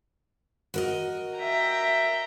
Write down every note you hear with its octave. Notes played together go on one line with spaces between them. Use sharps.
F#4 A#4 D#5
E5 G5 A#5